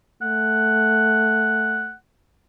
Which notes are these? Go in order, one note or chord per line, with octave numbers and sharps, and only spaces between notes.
A3 F#5